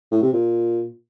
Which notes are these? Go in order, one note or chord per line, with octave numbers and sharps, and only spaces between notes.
A2
C3
A#2